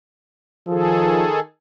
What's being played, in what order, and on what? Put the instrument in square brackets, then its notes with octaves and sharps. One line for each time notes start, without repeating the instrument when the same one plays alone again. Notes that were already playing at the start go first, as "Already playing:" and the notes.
[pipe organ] D#3 G#4 A4 [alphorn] F3